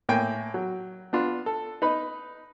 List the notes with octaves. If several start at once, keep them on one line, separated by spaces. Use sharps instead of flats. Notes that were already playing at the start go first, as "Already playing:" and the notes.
A2 A#3 G5 G#5
F#3
B3 D4 F4
A4
D#4 B4 B5